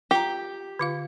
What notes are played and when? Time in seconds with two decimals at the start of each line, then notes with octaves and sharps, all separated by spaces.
0.11 F4 G4 A#5
0.79 D3 F4 F5